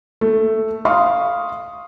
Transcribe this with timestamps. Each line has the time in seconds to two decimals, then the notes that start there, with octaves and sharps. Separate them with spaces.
0.21 A3
0.85 F5 C6 C#6 D#6